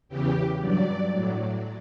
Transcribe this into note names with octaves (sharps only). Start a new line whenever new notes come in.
E2 C#3 E3 G4
G2 F#3 D5
A2 F#3